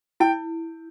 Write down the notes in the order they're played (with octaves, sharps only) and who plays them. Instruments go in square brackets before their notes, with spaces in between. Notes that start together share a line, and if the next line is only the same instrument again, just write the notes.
[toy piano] E4 [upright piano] G5